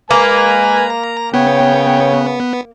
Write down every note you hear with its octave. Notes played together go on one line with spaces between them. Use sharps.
G#3 A#3 B4 G#5 A#5
C#3 B3 C#5 G5